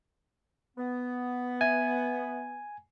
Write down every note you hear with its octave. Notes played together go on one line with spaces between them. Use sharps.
B3
E5 G#5